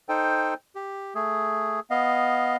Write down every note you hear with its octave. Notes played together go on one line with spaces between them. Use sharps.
D#4 A4 C5 G5
G4
A3 G#4
B3 D#5 F5